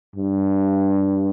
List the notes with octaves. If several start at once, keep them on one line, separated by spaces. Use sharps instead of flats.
G2